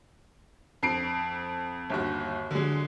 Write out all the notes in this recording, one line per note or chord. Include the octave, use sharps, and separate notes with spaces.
F2 C7 D7
G1 D#2 F#4
D3 F#3 G#3